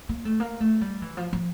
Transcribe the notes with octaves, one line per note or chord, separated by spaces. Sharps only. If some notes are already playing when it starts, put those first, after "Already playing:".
A#3
A3
A#3
A3
G3
E3
F3
F3